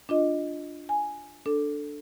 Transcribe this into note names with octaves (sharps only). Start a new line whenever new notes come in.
D4 F4 D#5
G#5
D4 A4